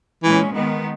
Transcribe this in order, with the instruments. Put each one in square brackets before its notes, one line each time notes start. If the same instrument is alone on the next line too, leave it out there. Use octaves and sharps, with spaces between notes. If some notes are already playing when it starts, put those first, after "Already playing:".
[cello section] A#2 G#3 C#4 [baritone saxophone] E3
[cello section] D#3 G#3 B3